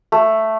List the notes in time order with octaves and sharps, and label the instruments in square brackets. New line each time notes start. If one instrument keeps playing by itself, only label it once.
[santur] A3